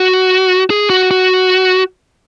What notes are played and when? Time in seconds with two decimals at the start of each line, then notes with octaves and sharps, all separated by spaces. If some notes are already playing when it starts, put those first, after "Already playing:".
Already playing: F#4
0.70 G#4
0.90 F#4
1.11 F#4